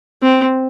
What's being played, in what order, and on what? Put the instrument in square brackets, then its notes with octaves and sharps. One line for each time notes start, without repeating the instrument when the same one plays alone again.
[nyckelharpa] C4